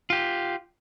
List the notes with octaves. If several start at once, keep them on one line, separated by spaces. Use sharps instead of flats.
F4 G4